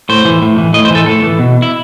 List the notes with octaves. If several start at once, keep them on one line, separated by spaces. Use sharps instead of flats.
A2 C5
E3
A2
E3
A2 D#5
C5
E3 A4
A2 A4
E3
B2
E4